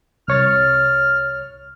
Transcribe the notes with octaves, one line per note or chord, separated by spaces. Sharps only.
C2 C#5 F6 A6